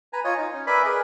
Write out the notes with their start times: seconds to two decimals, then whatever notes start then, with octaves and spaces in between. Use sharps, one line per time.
0.13 B4 G#5 A#5
0.24 F4 C#5 D#5 G#5
0.37 D#4
0.53 C#4
0.67 A#4 B4 D5 E5 G#5 B5
0.85 G#4 A#4 B4 D#5